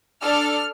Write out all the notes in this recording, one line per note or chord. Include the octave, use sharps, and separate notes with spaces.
D4 A4 F6